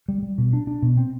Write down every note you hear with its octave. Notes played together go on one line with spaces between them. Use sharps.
G3
G3
B2
D4
D4
B2
C4